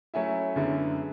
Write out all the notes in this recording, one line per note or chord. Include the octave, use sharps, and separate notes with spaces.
F#3 A3 C#4 E4
F#2 D3 G#3 B3 E4